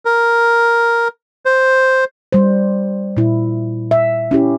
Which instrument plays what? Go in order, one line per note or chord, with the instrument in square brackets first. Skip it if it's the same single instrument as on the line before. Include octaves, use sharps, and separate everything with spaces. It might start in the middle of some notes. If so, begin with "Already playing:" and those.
[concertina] A#4
C5
[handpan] G3 C5
A#2 E4
E5
C#4 E4 G4